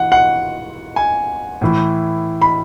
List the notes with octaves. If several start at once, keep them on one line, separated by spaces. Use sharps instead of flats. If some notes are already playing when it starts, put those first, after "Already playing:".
Already playing: E3 F#5
F#5
G#5
A2 E3
B5